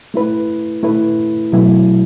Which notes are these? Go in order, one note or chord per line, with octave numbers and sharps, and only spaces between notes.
A3 E4 B4
A3 E4 B4
B2 F#3 A3 E4